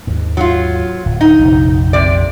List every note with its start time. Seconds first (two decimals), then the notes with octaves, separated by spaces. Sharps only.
0.07 D#2 G#2
0.37 F#3 F4
1.06 D1
1.21 D#4
1.39 F1 A#1
1.93 C3 D5